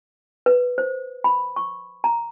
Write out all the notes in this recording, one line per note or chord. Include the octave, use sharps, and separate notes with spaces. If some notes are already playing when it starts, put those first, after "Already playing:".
B4
C5
B5
C#6
A#5